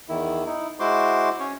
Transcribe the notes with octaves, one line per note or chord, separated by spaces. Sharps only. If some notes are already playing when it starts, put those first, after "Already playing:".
E2 D#3 E4
D#4 E4
G#3 E4 F#4 C5 C6 D6
C#4 C#5